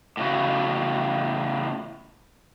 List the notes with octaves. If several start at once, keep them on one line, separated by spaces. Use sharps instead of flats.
A2 C#3 F#4